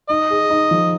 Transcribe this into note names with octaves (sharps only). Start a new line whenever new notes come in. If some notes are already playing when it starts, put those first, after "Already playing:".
D#4 D#5
G#4
D#4
F3